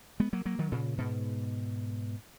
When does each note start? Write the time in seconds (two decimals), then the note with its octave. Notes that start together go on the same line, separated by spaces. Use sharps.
0.20 G#3 B3
0.33 F#3 A#3
0.45 F#3 A#3
0.59 D#3 F#3
0.72 A#2 C#3
0.98 G#2 B2